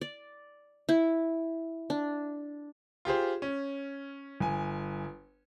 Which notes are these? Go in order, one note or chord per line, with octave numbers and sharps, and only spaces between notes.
D5
E4
D4
F4 G4 G#4 C5
C#4
G1 G#5